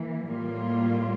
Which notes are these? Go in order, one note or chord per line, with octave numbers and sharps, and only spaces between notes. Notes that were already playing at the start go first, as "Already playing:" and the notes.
Already playing: E3 A#3
A2 G3 A#3 F4